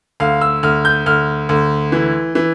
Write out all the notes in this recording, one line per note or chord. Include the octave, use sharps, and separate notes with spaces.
D2 F5
E6
D2 F6
G6
D2 F6
D2
E3
E3